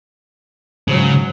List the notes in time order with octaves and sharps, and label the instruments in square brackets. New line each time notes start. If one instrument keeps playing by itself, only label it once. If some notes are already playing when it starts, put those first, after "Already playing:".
[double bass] G#2 F#3 [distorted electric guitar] C#3